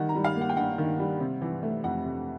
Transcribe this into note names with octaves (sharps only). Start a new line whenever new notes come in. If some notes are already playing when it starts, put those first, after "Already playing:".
Already playing: D#3 G3 F#5
A#5
G3
F5
A#3
F#5
G5
G2 F#5
D#3
G3
C3
E3
A3
F2 F#5
C3